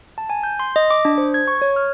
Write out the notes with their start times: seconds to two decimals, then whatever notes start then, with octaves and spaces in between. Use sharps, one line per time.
0.18 A5
0.30 G#5
0.44 G6
0.60 C6
0.76 D#5
0.91 D6
1.05 D4
1.18 C5
1.34 G#6
1.48 C#6
1.62 C#5
1.76 F6